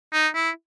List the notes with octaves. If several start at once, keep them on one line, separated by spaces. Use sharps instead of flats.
D#4
E4